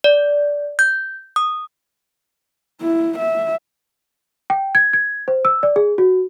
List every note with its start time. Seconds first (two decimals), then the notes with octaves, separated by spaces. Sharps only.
0.04 D5
0.79 G6
1.36 D#6
2.81 E4
3.19 E5
4.50 G5
4.75 G#6
4.93 G#6
5.28 C5
5.45 E6
5.63 D5
5.76 G#4
5.98 F#4